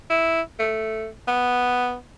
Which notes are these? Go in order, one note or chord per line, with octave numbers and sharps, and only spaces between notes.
E4
A3
B3